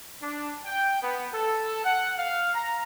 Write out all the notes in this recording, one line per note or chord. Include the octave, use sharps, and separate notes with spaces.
D4
G5
B3
A4
F#5
F5
A#5